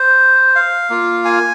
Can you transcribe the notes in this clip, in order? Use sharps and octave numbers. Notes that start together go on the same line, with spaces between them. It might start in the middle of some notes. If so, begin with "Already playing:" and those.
Already playing: C5
F5
A#3 F4
G#5